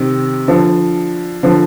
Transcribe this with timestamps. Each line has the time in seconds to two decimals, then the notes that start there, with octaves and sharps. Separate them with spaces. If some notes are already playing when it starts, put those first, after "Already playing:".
Already playing: C3 D#3
0.48 D3 F3
1.43 D3 F3